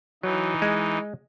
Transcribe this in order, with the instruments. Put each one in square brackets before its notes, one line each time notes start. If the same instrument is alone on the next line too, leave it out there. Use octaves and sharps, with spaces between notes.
[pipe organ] E3 D#4 [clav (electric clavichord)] F#3
[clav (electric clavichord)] G#3